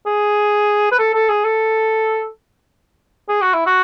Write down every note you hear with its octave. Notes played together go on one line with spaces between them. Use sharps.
G#4
B4
A4
A4
G#4
A4
G#4
F#4
E4
F#4